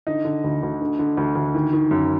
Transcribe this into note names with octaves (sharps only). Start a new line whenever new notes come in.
D3 D#4
D3
D2
D2
D3
D3
D2
D2
D#3
D#3
F#2